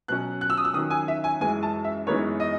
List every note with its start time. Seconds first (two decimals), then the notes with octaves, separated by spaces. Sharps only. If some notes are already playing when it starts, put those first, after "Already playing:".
0.08 B2 F#3 C#4 F#6
0.41 F#6
0.50 E6
0.57 D#6
0.65 E6
0.74 D#3 F#3 C#4 D#6
0.90 G#5
1.08 E5
1.24 G#5
1.41 F#2 E3 G#3 G#5
1.63 A5
1.84 E5
2.07 F#2 E3 G#3 B3 D#4 C#5
2.40 D#5